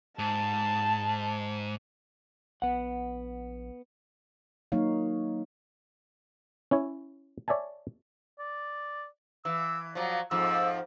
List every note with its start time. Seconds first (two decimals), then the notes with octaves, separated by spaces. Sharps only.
0.19 G#2 A5
2.62 A#1 B3 F#5
4.72 F#3 A#3 D#4 C#5 F5
6.71 C#4 E4 C#5
7.48 C#5 D5 E5 G#5 A5
8.39 D5
9.45 E3 E6
9.95 F3 F#3 D5
10.31 F2 G#2 F3 E6